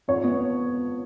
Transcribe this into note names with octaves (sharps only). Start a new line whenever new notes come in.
F2 C#5
B3